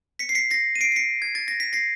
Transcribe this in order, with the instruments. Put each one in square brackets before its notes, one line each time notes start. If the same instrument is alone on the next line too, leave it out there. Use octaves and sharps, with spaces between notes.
[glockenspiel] B6 C#7
C7
B6 C#7
A#6 C7
D#7
C7 D7
C7
B6 C#7
G#6
A6
A#6
B6
A#6 C7